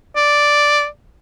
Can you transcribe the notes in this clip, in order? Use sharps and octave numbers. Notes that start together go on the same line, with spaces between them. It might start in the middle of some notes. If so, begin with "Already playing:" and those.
D5